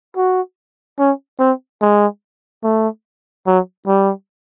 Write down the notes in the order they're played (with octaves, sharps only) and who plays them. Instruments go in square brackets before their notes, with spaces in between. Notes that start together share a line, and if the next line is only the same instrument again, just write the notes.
[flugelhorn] F#4
C#4
C4
G#3
A3
F#3
G3